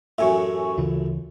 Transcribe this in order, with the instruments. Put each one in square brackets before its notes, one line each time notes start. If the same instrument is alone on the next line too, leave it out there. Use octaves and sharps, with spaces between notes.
[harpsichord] A1 F#2 A2 [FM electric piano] E5 G#5 C#6
[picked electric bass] D2 C#3 E3 [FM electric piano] F4